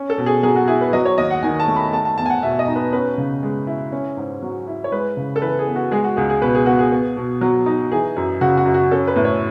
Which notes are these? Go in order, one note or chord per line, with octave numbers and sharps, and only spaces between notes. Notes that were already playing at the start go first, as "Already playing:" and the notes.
Already playing: C#4
A4
B2
G#4
F#3 G#4
F#4
E4 G#4
B4
F#3 D#5
C#5
D#2 D#5
F#5
D#3 G#5
A5
A3
B5
A3 A5
A5
E2 A5
G#5
F#5
B2 E5
D#5
D#4
B4
C#4 B4
C#3
G#3
E4
C#4
G#2
F#3
E4
C#5
G#3 B4
C#3
A4
E3 B4
G#4
B3
F#4
G#3 G#4
F#4
C#2 G#4
G#4
B2 B4
G#4
B3 F#4
G#4
B3
B2
F#3
D#4
E3 G#4
F#2
C#3 F#4
F#4
F#2
F#4
C#4 A4
B4
A2
C#5